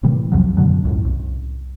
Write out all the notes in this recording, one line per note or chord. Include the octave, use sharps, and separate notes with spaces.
A2 C3 E3 G3
C2 F2 F3 F#3
F#2 B2 D3 F#3
C#2 F#2 A2
C2